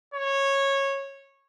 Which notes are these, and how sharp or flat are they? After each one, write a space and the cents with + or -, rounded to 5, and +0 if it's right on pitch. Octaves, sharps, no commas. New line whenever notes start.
C#5 -15